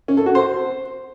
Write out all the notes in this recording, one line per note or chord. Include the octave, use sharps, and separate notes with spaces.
C#4
A4
F#4
C5